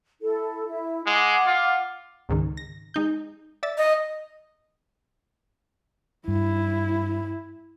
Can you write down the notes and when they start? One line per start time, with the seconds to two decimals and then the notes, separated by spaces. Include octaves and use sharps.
0.21 E4 A4
0.65 E4
1.07 G#3 F#5 D6
1.47 F4
2.29 C#2 G#2 D#3
2.57 A#6
2.94 G#3 D#4 G6
3.63 D5 E5 A6
3.78 D#5
6.28 G2 E4